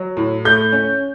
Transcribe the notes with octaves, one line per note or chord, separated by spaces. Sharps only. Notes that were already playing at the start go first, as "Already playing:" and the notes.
Already playing: F#3
A2
A3 G6
C#4